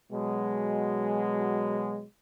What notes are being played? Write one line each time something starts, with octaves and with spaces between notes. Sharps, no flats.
B2 F#3 G#3